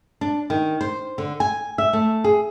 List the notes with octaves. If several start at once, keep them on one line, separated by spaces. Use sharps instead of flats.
D4
D#3
C5
D3
G#5
E5
A3
G#4